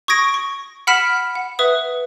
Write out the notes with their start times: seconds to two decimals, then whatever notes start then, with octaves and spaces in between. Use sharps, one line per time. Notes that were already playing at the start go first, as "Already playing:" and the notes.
0.08 C#6 D#6 G#6 A#6 D7
0.34 C#6
0.87 F#5 B5 F6 B6 D7 E7
1.35 F#5
1.59 B4 E5 D#6